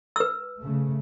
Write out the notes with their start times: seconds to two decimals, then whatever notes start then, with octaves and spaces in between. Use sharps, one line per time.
0.16 B4 E6
0.59 C#3 A3